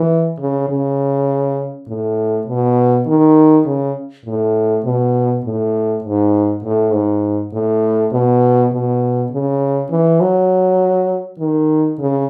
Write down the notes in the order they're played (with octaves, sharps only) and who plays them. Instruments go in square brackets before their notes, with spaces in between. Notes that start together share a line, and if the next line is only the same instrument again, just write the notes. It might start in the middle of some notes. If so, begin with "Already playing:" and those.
Already playing: [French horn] E3
C#3
C#3
A2
B2
D#3
C#3
A2
B2
A2
G#2
A2
G#2
A2
B2
B2
C#3
E3
F#3
D#3
C#3